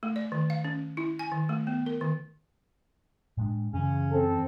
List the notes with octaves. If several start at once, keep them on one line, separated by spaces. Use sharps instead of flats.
A3
D5
D#3
F5
C#4
E4
G#5
D#3
A3
B3
A#4
D#3
A2 G#3 D4
F#2 C#3 E3 C#4
C4 A4